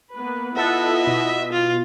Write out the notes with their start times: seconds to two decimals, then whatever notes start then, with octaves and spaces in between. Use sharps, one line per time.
0.16 A#3 B3 B4
0.56 B3 E4 F4 A4 D#5 E5 F#5
1.07 B2
1.52 F4